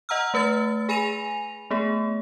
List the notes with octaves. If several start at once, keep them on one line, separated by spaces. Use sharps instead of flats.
D#5 F#5 A#5 E6 F6
A3 B4 E6 A6
G#4 G#5 B5 A#6 D#7 F7
A3 B3 G#4